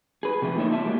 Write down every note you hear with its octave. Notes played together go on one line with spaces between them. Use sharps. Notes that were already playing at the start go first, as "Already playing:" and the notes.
G#4 B4
C3 F3 A3
A#3 D#4 F4 C#5 E5
E2 D4 F4 E5 A5
F#3 G#3 A#3 G4